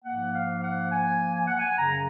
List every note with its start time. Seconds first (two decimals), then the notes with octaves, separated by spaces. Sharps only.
0.05 G#2 F3 A#3 F#5
0.34 F5
0.63 F#5
0.92 G#5
1.35 G#5
1.47 F#5
1.59 G#5
1.78 F#2 C#3 F#3 A#5